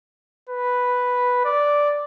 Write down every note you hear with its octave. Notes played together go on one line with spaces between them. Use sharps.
B4
D5